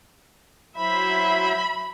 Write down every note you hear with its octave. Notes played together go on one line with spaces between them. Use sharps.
F#3 E4 C5 E5 B5